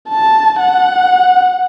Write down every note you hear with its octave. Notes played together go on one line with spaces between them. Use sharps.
A5
F#5